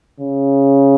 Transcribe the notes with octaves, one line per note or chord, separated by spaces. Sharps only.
C#3